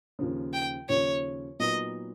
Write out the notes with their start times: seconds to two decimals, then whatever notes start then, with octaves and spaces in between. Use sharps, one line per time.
0.19 D#2 C#3 F3
0.53 G5
0.89 D#2 C#3 F3 C#5
1.59 A#2 F#3 B3 D#4 D#5